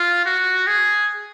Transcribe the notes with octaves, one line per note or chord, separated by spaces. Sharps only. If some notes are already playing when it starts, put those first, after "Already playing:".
Already playing: F4
F#4
G#4